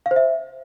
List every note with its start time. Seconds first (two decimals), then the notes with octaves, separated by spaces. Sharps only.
0.06 F5
0.11 C5
0.16 E5